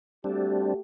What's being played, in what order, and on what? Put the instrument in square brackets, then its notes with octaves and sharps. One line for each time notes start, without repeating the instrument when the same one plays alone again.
[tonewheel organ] G3 C4 D4 [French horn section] A3 F#4 G4